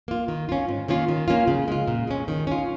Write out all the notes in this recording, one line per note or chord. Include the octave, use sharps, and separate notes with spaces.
A#3 F4
D#3
C#4 F4
G#2
D#3 A#3 C#4 F4
D#3
A#3 C#4 F4
C#3
G#3 F4
A#2
G#3 C#4
D#3
C#4 F4